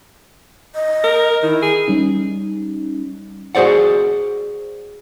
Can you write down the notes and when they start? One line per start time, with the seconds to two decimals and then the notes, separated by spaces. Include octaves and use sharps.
0.75 D#5
1.04 A#4
1.43 D#3 E4
1.62 G#4
1.88 G3 C#4 D#4
3.55 F#4 G#4 C5 D5 F#5